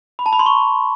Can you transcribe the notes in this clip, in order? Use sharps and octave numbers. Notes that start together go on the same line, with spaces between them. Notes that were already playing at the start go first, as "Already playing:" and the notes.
B5
A5
B5
C6
C#6